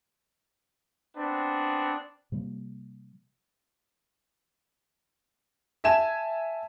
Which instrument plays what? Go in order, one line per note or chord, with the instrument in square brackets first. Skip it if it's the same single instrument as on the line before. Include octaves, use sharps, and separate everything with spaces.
[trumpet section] B3 C4 D4
[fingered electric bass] C3 F3 G3 A#3
[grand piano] E5 G#5 A5 G#6 E7